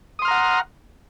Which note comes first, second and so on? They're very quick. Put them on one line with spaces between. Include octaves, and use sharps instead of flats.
D#6 C6 F6 A#5 F#5